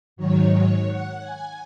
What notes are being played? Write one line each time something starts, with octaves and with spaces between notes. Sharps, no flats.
G#2 D#3 F#3 C#5
C#5
F#5
G#5